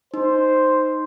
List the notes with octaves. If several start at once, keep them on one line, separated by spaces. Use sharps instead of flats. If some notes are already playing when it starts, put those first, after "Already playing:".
D#4 C5